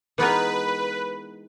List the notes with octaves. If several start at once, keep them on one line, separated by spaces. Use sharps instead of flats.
E3 G#3 B3 D#4 A#4 B4